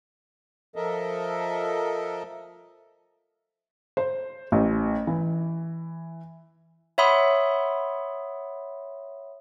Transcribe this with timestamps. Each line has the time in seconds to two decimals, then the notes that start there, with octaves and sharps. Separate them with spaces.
0.76 F3 A4 A#4 D#5 E5
3.97 C5
4.52 A1
5.07 E3
6.98 C#5 E5 F#5 B5 C6 D#6